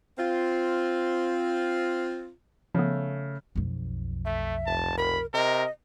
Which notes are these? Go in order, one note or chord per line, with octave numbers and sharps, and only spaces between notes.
C4 F4
C#3 F3 A3 B3
B1 F2
A3 E5
F1 A5
A#4 B5
C3 A#4 D#5